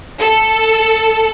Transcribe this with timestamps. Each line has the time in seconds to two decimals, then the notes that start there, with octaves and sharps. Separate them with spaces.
0.20 A4